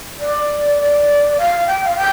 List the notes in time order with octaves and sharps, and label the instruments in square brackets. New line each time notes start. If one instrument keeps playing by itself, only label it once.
[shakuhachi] D5
D5
F5
G5
F5
G5